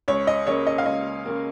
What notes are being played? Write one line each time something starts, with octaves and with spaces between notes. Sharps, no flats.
C#2 C#5
D#5
C#3 A#3 C#5
D#5
F5
C#2 D#5
C#3 A#3